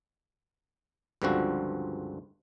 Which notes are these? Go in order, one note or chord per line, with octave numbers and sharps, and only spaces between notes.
C#2 G2 D3 F3 C4 F#4